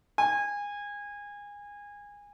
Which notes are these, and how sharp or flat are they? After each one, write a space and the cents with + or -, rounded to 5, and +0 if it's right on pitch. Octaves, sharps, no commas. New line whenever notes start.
G#5 -25